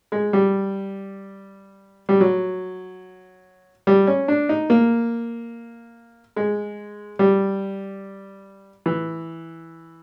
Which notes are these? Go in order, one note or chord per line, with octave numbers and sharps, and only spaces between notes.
G#3
G3
G3
F#3
G3
C#4
D4
D#4
A#3
G#3
G3
E3